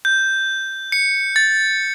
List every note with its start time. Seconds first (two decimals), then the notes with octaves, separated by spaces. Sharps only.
0.05 G6
0.92 C#7
1.36 A6